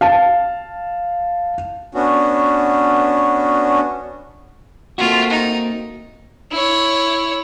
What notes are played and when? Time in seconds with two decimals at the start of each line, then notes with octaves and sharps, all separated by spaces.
0.01 F5 A5
1.95 B3 C#4 D4 F#4
4.98 A3 A#3 C4 F4 F#4
5.30 D#4
6.51 E4 C#5